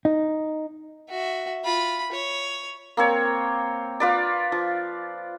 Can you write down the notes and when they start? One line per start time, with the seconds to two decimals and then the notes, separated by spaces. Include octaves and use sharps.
0.05 D#4
1.10 F#4 E5
1.64 F4 B5
2.12 C#5
2.97 A#3 C4 C#5
4.00 F4 B4 D5
4.52 F3